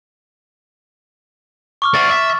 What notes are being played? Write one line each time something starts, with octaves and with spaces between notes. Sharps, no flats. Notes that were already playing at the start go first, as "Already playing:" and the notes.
C#6 D6 F6
D5 E5 A6
E5